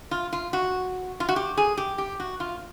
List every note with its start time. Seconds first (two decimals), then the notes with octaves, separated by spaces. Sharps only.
0.11 F4
0.33 F4
0.53 F#4
1.20 F4
1.29 F#4
1.36 G4
1.57 G#4
1.77 G4
1.98 G4
2.20 F#4
2.40 F4